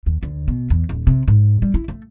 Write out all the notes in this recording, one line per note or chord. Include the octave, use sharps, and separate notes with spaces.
D#2
D2
B2
E2
D#1
C3
G#2
G3
E4
A3